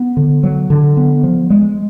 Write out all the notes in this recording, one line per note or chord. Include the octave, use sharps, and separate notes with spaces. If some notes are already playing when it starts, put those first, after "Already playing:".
Already playing: B3
D3
F#3
D3
B3
F3
G#3